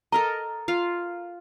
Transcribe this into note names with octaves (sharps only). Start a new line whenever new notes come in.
A4 A#4 D#5 A#5
F4 F5